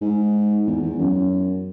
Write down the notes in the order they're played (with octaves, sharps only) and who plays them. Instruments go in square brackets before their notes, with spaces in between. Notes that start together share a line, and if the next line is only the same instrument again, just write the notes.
[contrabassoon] G#2
E2
E2
F#2